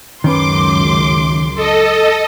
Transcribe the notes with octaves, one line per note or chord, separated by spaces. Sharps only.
C#2 F#2 D#3 C#4 B4 C6 D6
A4 D#5